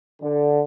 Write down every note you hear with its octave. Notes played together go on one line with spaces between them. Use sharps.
D3